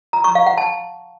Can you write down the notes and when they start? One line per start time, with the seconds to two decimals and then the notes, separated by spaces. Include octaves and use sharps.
0.13 A#5
0.24 C#6
0.35 F5
0.46 F#5
0.58 A5